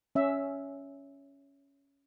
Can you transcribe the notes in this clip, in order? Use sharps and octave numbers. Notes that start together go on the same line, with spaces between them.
C#4 E5